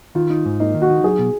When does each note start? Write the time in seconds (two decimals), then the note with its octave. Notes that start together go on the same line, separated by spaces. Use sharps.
0.15 D#3 F4
0.30 D#4
0.45 G#2
0.60 A#3 D#4
0.74 D#3
0.82 F#4
0.90 D#4
1.03 F#3 G#4
1.19 B2